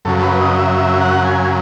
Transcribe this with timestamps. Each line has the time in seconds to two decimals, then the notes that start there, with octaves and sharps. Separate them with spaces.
0.05 F#2 C#3 F#3 A4
0.18 A4
0.22 B4
0.40 D#5
0.58 E5
0.77 E5
1.01 F#5
1.24 G#5